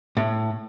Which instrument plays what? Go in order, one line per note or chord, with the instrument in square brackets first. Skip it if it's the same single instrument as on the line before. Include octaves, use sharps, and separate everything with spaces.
[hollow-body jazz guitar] A2